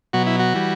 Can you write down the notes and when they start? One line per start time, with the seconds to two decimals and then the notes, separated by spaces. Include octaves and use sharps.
0.13 B2 F#3 F#4
0.27 E4
0.40 F#4
0.54 E3 G3